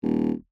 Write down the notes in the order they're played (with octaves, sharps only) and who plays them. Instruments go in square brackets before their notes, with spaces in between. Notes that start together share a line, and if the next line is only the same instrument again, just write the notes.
[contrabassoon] D#1